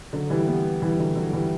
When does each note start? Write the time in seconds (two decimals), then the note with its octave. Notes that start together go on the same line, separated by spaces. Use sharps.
0.13 D3 F#3
0.30 E3 G3
0.47 G3 B3
0.82 E3 G3
0.99 D3 F#3
1.16 D3 F#3
1.33 E3 G3